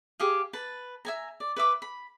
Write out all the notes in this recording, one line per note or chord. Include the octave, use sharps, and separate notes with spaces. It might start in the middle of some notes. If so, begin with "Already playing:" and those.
G4 G#4 F5
B4 A5
E5 G#5 A#5
D5
B4 E5 D6
B5